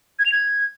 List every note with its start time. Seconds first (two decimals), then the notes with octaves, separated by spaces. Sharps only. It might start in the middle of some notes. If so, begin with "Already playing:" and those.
0.19 G#6
0.26 F7
0.32 G#6